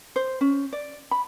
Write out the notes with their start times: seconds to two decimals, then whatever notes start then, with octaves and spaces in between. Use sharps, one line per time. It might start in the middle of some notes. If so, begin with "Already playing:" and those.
0.16 C5
0.41 C#4
0.73 D5
1.11 B5